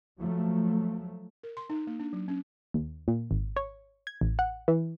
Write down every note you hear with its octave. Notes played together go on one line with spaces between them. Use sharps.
F3 F#3 A3
A#4
C6
D#4
A#3
D4
F#3
C#4
D#2
A#2
G#1
C#5
G#6
A1
F#5
E3